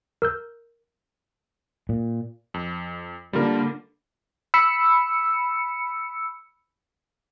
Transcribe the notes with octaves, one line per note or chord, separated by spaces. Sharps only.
A#4 E6 G6
A#2
F2
D3 G3 A#3 F4 A#4
B5 E6 C#7